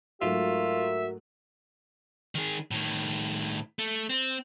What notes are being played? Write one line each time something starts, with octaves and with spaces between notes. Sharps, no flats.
G#2 F#3 A3 F4 F#4 A#4 E5
D#3 G#4
A2 D#3
A3
C4